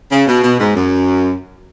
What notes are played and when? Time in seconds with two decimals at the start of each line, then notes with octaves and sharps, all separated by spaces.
0.12 C#3
0.27 B2
0.44 B2
0.60 G#2
0.76 F#2